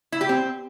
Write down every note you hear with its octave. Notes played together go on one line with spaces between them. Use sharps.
E4
G4
C4